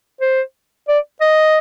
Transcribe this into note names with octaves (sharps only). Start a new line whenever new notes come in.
C5
D5
D#5